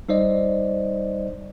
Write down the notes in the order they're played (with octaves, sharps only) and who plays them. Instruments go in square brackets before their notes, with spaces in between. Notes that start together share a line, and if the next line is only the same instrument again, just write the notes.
[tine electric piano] G3 D#4 C5 D5 D#5